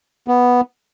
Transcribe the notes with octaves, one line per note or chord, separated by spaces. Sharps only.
B3